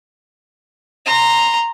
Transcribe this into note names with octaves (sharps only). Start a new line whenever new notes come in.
A#5 C6